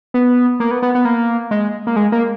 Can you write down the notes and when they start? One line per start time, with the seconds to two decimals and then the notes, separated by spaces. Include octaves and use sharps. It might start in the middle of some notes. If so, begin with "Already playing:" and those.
0.14 B3
0.60 A#3
0.71 B3
0.82 B3
0.95 B3
1.05 A#3
1.51 G#3
1.87 A#3
1.96 G#3
2.12 A#3